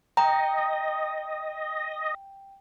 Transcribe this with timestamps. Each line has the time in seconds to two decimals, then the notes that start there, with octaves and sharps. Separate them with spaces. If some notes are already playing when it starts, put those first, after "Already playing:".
0.17 D#5 G5 A#5